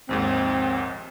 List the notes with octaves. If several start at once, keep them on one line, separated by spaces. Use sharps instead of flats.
A#1 D#2 G#2 C4